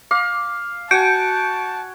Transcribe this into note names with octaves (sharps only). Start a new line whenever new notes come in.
F5 D6
F#4 G#5 A5 G6 C#7 D7